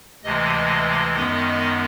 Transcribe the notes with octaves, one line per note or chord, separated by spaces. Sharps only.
D2 C3 E3 G#3 D#5
F#2 D#3 G#3 B3 D#4